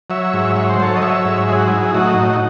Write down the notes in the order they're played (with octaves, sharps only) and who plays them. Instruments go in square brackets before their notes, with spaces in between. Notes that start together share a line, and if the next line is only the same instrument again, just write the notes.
[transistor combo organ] F#3 C#5 E5
G#2
F#3 C#5
C5
F#3 A4 C#5
D#5
F#3 C#5 E5
G#2
F#3 G#4
F#4
F#3 E4 G#4
A2 D#4 F#4
A2